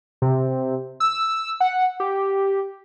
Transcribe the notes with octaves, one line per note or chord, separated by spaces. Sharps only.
C3
E6
F#5
G4